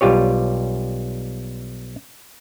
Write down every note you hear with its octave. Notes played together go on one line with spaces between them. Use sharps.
B1 G3 F4 G4 C#5